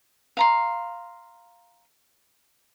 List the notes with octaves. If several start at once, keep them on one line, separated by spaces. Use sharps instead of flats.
F5 A#5 C6